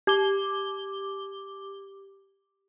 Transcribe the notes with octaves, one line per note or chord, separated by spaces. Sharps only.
G4 D6 G7